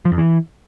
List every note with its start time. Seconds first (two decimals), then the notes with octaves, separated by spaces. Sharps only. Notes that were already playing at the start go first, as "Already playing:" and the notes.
0.05 F3
0.12 F2
0.18 E3